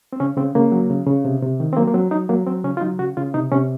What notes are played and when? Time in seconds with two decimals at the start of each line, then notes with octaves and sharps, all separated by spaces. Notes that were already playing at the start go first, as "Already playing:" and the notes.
0.13 C4
0.20 C#3 C#4
0.37 C#3 C4
0.55 C#3 A#3
0.72 F#3
0.90 C#3
1.07 C#3
1.25 C3
1.42 C3
1.60 D#3
1.73 C4
1.77 F#3 A#3
1.88 A#3
1.94 F#3 C4
2.11 F#3 D#4
2.29 F#3 A#3
2.47 F#3 C4
2.64 C#3 C#4
2.77 F4
2.81 F#3 D#4
2.99 C#3 F#4
3.17 C#3 F4
3.34 C3 D#4
3.52 C3 C#4